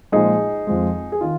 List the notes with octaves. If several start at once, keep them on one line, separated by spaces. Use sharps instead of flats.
A#2 F3 G#3 D#4 G#4
F2 F3 G#3
G#4
D#3 F4